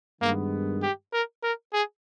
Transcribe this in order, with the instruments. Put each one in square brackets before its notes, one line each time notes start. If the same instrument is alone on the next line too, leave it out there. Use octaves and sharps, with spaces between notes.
[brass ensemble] G2 D#3 G#3 B3 [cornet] A#3
[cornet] G4
A#4
A#4
G#4